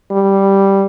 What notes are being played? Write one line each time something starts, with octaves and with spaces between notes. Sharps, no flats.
G3